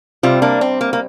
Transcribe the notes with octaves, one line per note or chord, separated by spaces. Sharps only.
C3 G3 C4 F4
A#3 D4
C4
A#3
A#3